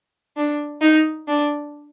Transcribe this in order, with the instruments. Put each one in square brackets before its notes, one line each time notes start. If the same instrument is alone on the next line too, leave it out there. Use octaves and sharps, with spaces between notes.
[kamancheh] D4
D#4
D4